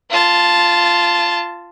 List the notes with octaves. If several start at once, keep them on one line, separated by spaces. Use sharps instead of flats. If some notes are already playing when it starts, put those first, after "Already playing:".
F4 A5